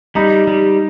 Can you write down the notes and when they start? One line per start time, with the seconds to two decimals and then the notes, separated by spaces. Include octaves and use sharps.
0.15 G3 D#4
0.47 G3